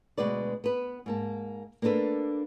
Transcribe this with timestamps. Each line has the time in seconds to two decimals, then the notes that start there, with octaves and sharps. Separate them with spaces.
0.18 D2 B2 G#3 B4 D5
0.64 B3 B4
1.06 G#2 A#3 A5
1.82 A#3 B3 D4 A4 B4 F5